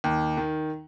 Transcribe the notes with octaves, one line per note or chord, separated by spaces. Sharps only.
D#2
D#3